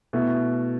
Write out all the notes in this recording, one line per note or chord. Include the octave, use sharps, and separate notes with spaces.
B2 A3 E4